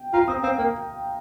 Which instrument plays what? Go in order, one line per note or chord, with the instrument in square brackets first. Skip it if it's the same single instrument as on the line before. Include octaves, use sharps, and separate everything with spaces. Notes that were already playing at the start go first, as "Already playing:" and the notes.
Already playing: [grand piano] G5
[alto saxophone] F4 [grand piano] A#5
[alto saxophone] C4 [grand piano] D#6
[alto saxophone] C4 [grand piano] F5
[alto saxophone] A#3 [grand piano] G5